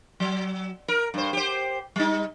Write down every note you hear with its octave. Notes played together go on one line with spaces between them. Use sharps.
F#3
A#4
G2 C5
G4 C5
G3 D#4